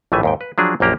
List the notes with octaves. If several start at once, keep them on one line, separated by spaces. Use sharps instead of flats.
A#1 A2 E3 A3 E5 G#5
D#2 G#2 G5
B4
F3 F#3 D4 G#4
A#1 F#2 A#3 G4 A#5